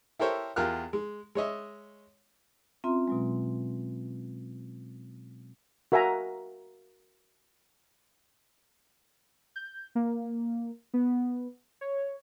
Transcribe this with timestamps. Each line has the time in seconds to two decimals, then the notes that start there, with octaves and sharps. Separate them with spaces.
0.20 E4 G4 A4 A#4 C5 C#5
0.56 E2 F4 G4 A#4 F6 F#6
0.93 G#3
1.35 G#3 C#5 D#5 E5
2.84 C4 C#4 F4 E5 A#5 C6
3.08 B2 F#3 G#3
5.92 F#4 A#4 E5 F#5 G#5 A#5
9.56 G6
9.95 A#3
10.94 B3
11.81 C#5